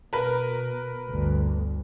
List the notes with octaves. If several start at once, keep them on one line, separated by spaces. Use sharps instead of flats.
B2 A#4 B4
G1 D2